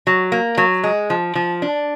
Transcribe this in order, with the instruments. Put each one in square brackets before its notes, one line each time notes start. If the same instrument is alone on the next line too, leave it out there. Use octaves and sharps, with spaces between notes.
[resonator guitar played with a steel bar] F#3
A#3
F#3
G#3
F3
F3
D4